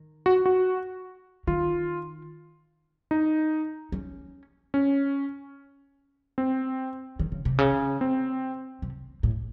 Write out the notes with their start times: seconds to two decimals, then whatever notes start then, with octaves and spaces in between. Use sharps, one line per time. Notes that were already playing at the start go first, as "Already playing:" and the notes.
Already playing: D#3
0.26 F#4
0.46 F#4
1.47 D#3 F4
3.11 D#4
3.92 C#4
4.74 C#4
6.38 C4
7.19 D#3
7.32 C#3
7.45 C3
7.58 C#3
8.01 C4
8.82 C3
9.23 A2